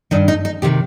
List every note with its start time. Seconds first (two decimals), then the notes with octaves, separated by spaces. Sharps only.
0.11 G2 D#3 D#4
0.28 D#4
0.45 D#4
0.62 C3 D#3 G4